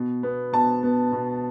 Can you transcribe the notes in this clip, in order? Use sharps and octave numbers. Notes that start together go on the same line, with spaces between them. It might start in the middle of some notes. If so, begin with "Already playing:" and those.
Already playing: B2
B3
B2 A5
B3
B2